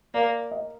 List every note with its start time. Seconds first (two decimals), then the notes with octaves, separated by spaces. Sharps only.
0.14 A#3 D5
0.51 D#5